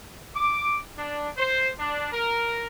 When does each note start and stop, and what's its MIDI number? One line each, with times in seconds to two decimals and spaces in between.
0.36 0.78 86
0.97 1.29 62
1.38 1.69 72
1.79 2.08 62
2.12 2.66 70